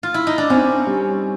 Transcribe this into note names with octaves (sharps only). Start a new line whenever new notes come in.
F4
E4
D#4
D4
C4 C#4
G3